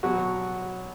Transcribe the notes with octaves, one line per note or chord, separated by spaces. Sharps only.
B2 F#3 F#4